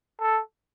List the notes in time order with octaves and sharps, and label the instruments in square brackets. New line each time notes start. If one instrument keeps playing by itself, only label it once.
[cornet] A4